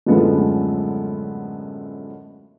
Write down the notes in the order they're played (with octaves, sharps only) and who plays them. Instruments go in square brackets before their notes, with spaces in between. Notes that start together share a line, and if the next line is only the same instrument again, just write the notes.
[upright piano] F#2 A2 D3 F3 G#3 B3